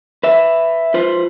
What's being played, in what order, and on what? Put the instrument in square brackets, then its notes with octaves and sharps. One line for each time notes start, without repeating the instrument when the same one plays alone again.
[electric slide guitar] B4 E5
F4 B4 C5